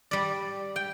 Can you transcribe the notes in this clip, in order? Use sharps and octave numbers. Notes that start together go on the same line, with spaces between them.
G3 D5
G5